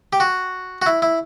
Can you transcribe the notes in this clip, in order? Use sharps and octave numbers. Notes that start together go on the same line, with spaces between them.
G4
F#4
F#4
E4
E4